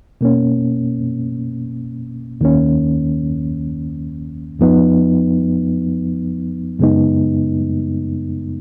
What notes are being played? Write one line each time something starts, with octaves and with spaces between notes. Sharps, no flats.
B2 A#3 C#4
D#2 D#3 A#3 C#4
F2 F3 B3 D#4
F#2 C#3 G#3 B3 D#4